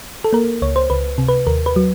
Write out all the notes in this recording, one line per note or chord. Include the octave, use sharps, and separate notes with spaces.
A4
A#3 A#4
C#2 C#5
C5
C#2 B4
C3
B4
D#2 A#4
B4
F#3